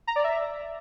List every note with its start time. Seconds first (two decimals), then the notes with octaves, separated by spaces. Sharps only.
0.07 A#5
0.16 D5
0.24 E5